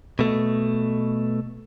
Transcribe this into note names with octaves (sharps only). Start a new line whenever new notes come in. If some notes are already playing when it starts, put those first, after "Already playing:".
B2 A3